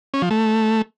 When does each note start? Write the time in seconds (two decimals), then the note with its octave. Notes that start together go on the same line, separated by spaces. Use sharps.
0.14 C#4
0.22 F3
0.31 A3